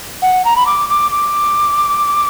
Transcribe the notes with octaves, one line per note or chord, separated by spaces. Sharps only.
F#5
A#5
B5
D6
D6
D6